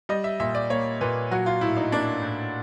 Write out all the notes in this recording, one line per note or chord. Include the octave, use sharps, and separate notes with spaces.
G3 D#5
E5
A#2 E5
D5
A#3 C#5
A#2 B4
F#3 F#4
F4
A2 E4
D#4
A#3 D4
A2